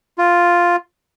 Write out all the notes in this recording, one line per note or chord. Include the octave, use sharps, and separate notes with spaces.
F4